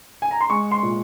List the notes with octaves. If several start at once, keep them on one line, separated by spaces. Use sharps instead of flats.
G#5
A#5
C6
G#3 C#6
C6
A#2